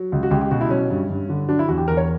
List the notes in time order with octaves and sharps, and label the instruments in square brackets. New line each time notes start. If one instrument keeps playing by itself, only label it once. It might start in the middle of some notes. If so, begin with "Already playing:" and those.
Already playing: [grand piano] F#3
C#2
F#4
C#2 G4
G4
B2 F#4
E4
F#3 C#4
G2
G2
D3
F#3 D4
E4
E2 F#4
G4
E2 A#4
C#5